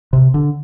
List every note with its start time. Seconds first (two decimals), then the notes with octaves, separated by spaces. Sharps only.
0.13 C3
0.34 D3